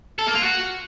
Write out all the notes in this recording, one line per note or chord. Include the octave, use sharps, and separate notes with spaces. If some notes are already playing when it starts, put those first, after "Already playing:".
A4
A#3
F4
F#4